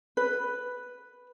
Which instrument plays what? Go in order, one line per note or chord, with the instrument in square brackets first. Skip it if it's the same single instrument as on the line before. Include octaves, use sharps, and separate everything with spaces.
[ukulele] B4